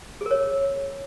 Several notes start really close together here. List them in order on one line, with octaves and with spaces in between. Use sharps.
G#4 A#4 C#5